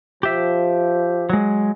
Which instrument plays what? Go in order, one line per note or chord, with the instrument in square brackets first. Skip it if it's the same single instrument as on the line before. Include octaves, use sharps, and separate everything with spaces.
[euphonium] F3 [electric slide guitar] G4 E5
[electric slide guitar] F#3 G#3